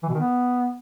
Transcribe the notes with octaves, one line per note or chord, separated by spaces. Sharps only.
E3
B2
D#3
B3